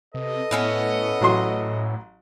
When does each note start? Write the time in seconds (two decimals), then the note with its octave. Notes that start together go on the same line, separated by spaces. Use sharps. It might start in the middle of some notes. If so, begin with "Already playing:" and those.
0.14 C3 A4 B4 D#5
0.51 A2 B3 C#4 E4
1.21 A1 A2 F#3 C6